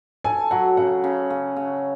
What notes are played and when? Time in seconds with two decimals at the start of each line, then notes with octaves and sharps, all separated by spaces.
0.24 A4 G#5
0.51 F#3 F#5
0.77 C#3 F#5
1.04 C#3
1.30 C#3
1.56 C#3